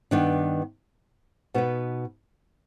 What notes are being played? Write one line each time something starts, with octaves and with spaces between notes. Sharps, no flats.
G2 D#3 B3 D4
B2 B3 D#4 B4